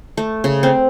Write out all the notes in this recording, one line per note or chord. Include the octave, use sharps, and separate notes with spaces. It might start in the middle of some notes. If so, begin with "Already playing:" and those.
A3
C#3
C4